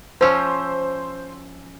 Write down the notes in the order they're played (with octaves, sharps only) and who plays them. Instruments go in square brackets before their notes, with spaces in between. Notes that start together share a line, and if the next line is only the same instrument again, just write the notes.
[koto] F3 C#4 [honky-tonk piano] C5 E6